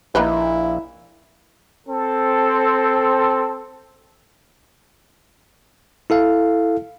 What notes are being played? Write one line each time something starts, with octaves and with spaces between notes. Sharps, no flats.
A#1 A#3 D#4 E4 B4
C4 A4
E4 A4 F5